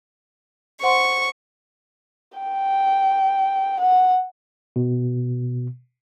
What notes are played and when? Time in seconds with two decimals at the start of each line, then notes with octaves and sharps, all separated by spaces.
0.83 C5 F#5 C6 C#6
2.38 G5
3.79 F#5
4.76 B2